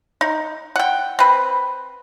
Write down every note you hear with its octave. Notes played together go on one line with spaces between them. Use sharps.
D#4
F#5 G5
C4 B4